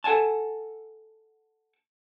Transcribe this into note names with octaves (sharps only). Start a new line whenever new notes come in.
A4 F#5 G#5 A5